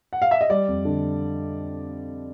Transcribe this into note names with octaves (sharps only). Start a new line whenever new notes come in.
F#5
F5
E5
D#5
G3 D5
F2
D3